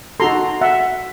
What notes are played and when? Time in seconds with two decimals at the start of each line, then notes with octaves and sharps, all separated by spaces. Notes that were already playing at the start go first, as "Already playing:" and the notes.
0.20 D#4 F#4 A4 A#5 C6
0.61 E5 F#5